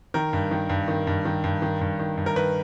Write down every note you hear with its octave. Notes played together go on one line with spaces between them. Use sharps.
D#3 A#4
G2
D#3
G2
D#3
G2
D#3
G2
D#3
G2
D#3
G2
A#4
D#3 B4